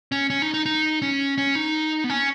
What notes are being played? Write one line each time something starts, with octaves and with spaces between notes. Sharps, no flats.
C#4
C#4
D#4
D#4
D#4
C#4
C#4
D#4
B3
C#4